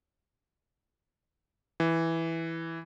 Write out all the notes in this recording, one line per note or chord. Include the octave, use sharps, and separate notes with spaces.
E3